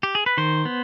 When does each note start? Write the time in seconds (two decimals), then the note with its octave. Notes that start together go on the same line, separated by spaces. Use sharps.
0.03 G4
0.15 G#4
0.26 B4
0.37 D#3 C5
0.65 B3